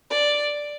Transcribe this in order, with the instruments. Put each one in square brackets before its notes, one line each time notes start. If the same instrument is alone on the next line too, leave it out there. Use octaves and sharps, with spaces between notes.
[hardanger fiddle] D5